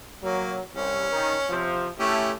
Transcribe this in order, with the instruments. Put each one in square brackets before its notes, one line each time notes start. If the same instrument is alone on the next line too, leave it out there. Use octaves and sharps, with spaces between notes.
[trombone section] F#3 [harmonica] A#3
[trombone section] C2 [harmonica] C#4
[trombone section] D#3
C3 F3
[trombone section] A3 [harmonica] C#4 E4 G4